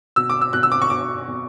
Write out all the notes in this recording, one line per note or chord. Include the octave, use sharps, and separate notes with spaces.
B2 E6
D6
E6
B2 F#6
E6
D6
C#6
B2 D6
B2